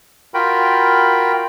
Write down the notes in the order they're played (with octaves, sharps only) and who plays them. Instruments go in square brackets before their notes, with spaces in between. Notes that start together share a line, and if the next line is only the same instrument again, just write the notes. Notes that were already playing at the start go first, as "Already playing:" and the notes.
[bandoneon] F4 F#4 A#4 G5 B5